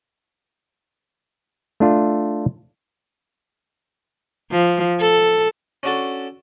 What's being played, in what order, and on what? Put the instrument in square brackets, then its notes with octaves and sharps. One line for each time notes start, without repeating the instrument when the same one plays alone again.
[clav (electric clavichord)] A3 D4 F4
[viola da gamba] F3
A4
[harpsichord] C#4 D4 F#4 A4